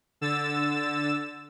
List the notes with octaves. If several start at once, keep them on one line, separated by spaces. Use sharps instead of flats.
D3 E6 A6 E7